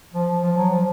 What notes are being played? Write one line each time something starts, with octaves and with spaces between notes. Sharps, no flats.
F3
F3
F#3
F3